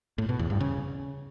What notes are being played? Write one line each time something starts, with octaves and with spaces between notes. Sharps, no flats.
A2
B2
E2
G2
C#3